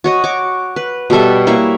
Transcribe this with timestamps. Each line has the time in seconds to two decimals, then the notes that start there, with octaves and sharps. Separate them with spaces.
0.04 F#4 C#5 D#5
0.24 C#5 C#6 D6
0.76 B4
1.10 B2 G3 A4 E5
1.47 A#3 E4 C#5 E5